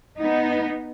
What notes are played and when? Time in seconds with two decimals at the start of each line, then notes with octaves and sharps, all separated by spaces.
0.20 B3 D#4